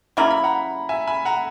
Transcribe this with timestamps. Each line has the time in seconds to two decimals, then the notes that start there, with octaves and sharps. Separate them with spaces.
0.17 C#3 F#3 A#3 E4 A#5
0.30 B5
0.44 F#5 A#5
0.89 E5 G#5
1.07 G#5 B5
1.25 F#5 A#5